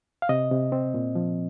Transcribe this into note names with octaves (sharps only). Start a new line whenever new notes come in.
F5
C3 D#5
C3
C4
A#2
F3